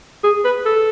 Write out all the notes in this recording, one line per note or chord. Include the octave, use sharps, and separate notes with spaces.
G#4
B4
A4